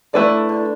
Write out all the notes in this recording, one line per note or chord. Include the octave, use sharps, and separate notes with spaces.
D3 A3 E4 B4 D5
D3